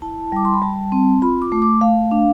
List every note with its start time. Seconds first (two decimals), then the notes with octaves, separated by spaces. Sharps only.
0.02 E4 A5
0.32 G3 D6
0.45 C6
0.54 B5
0.62 G3 A5
0.92 C4
1.22 F4 B5
1.42 D6
1.52 A3
1.62 D6
1.81 A3 F5
2.11 D4